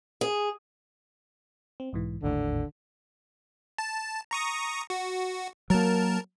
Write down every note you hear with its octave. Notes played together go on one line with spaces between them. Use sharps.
G#4
C4
B1 G#2 E3
G#1 D#2 A2 D3
A5
A#5 C#6 D#6
F#4
F#3 A#3 A#4 A5